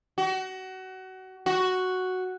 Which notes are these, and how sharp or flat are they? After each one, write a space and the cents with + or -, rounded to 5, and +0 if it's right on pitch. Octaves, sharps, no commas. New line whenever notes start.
F#4 +25
F#4 +0